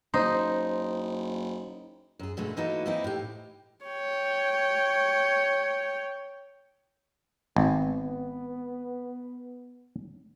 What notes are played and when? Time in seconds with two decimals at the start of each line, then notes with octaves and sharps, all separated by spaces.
0.14 F#1 D#4 C5 C6
2.19 F#2 G#4
2.37 G2 B2 G#3 A3
2.57 E3 A#3 D#4 E4 F#4 A4
2.86 E3 A#3 C4 D#4 E4
3.04 A2 G4
3.85 C#5 G5
7.56 G#1 B3